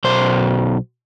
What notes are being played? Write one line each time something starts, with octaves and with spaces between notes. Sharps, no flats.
B1 C5